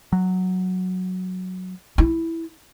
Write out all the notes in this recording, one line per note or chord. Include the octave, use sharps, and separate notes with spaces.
F#3
E4